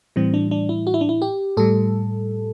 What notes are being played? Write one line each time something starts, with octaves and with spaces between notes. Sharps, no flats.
A2 E3 G3 C4
D4
D4
E4
F#4
E4
D4
E4
G4
A2 G3 A4